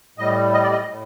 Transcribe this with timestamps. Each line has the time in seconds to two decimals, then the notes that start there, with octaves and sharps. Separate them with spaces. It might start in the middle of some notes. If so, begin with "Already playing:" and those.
0.18 A2 G3 D#5
0.53 D#5
0.63 D5
0.72 D#5
0.89 A2